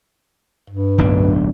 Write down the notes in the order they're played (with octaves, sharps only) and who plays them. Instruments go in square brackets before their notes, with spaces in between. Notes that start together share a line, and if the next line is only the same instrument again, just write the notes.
[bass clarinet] G2
[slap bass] D1 B1 D4